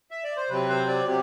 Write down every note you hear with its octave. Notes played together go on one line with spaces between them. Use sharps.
E5
D5
C5
C3 F#3 C4 B4
C5
D5
C3 F#3 G4